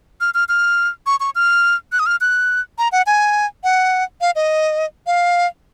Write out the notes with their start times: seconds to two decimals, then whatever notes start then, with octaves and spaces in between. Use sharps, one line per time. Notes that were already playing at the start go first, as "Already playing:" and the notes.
0.21 F6
0.34 F6
0.49 F6
1.06 C#6
1.20 C#6
1.35 F6
1.92 F#6
1.99 D#6
2.06 F6
2.21 F#6
2.78 A#5
2.92 F#5
3.06 G#5
3.64 F#5
4.21 F5
4.36 D#5
5.07 F5